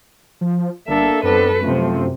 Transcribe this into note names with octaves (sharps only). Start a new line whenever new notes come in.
F3
G1 A#3 D4 A4 E5
F#2 B3 C4 D4 A4 B4
C3 F3 A3 C4